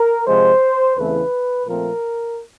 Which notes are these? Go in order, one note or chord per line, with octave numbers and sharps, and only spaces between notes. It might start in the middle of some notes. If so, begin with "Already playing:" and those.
Already playing: A#4
C3 F3 G#3 C5
E2 C#3 E3 A3 C4 B4
A#2 F3 A3 C4 A#4